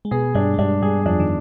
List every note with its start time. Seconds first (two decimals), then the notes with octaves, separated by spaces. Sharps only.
0.05 G#3
0.11 B2 B3 G#4
0.35 G2 G3 D4
0.54 G#3
0.58 G2 G3 D4
0.82 G2 G3 G#4
1.06 F2 F3 D4
1.20 D#3